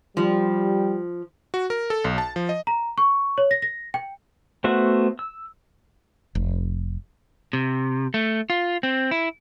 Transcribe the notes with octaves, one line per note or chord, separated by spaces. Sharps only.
F3 G3
F#4
A#4
A4
B1
A5
F3
D#5
A#5
C#6
C#5
A#6
A#6
G5
A3 B3 F#4 C5 E5
E6
F1
C3
A3
F4
C4
E4